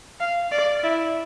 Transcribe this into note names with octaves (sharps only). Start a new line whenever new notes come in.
F5
D5
E4